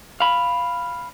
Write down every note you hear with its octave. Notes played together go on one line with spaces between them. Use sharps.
F5 B5